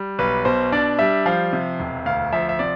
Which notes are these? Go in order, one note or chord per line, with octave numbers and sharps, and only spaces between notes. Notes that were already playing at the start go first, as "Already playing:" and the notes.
Already playing: G3
B1 B4
B2 C5
D4 D5
G3 E5
F3 F5
C3
E1
D2 F5
F3 E5
E5
C3 D5